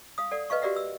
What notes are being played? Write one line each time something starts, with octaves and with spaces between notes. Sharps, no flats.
F5 D#6
A4 D5 F#5
B4 D#5 F5 C#6
F#4 G4 A#4 D5 E5 F#5
E6